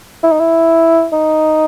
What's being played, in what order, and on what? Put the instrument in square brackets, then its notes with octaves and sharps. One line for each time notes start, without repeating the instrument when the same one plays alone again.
[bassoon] E4
D#4
E4
D#4